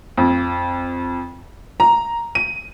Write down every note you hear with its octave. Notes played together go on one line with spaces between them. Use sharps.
F2
A#5
D#7